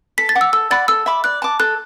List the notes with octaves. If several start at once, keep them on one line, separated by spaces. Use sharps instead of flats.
A4 B6
A6
F#5 D6
E6
A4 E6
D5 F#5 B5 A6
A4 E6
E5 B5 D6
D5 F#6
A5 D6
A4 F#6